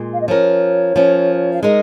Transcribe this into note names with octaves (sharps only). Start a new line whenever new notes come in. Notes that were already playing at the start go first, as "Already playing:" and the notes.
Already playing: A#2 G#3
F5
D#5
F3 C#4 A#4 C#5
F3 C#4 A#4
F5
G#3 D#4 A#4 D#5